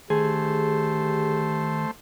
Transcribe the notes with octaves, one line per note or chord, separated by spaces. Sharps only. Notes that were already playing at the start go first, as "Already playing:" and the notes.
D3 D#3 A3 G4 G#4 C5